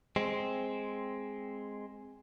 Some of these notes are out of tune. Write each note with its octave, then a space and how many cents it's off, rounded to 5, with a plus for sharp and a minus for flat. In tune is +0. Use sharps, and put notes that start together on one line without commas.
G#3 +0 C4 +0